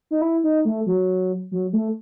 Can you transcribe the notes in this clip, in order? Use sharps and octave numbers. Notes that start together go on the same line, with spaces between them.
D#4
E4
D#4
A3
F#3
F#3
A3